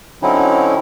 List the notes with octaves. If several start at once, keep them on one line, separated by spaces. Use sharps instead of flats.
D3 F#3 C4 C#4 D#4 E4